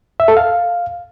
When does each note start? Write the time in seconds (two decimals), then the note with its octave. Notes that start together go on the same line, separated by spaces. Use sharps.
0.20 E5
0.28 A4
0.37 F5